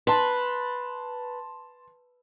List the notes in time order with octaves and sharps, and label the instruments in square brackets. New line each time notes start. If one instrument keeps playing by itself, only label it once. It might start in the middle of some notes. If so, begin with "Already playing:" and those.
[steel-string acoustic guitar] B4 [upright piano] A5 C6